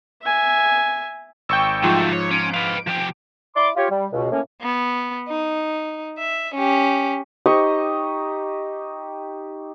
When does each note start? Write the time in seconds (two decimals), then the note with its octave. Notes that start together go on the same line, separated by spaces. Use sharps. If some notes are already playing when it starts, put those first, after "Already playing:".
0.23 E5 G#5
1.49 G#1 G5 C#6 E6
1.84 G#2 F3 F#3 A3 F4
2.13 C#5
2.31 C#4 D7
2.54 B4 F5
2.88 F3 G4
3.56 E4 D5 B5 C6 D6
3.77 F4 G4 C#5
3.90 G3
4.13 C#2 B2
4.32 A2 A#3 C#4
4.61 B3
5.28 D#4
6.19 E5
6.55 C#4 G4
7.46 D#4 G4 D#5 C#6